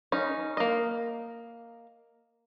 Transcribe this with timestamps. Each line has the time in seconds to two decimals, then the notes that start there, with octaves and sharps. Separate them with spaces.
0.12 C#4 D#4
0.57 A#3 D#5